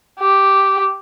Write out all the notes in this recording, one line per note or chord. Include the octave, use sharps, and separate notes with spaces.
G4